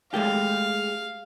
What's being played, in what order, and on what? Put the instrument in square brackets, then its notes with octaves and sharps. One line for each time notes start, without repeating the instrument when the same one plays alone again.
[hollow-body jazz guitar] G#3 A3 G4 [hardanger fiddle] F5